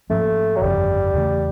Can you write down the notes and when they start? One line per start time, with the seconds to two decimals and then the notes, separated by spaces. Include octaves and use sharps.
0.10 G#2 F3 A3 A#3 C#4
0.56 F#3
0.62 G1 F2 C#3 G3
1.14 E2 C#3 E3 A3